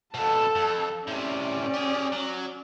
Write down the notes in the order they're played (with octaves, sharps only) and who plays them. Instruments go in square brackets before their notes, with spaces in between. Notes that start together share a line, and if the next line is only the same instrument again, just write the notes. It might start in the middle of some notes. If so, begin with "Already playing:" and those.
[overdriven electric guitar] F2 B2 [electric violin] A4 A5
[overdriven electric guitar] F2
[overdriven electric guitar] A2 C3 [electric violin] C#4 D5
[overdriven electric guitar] G4 G#4
F#3